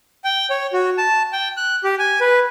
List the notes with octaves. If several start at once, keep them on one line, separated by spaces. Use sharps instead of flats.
G5
C#5
F#4
A5
G5
F#6
G4
G#5
B4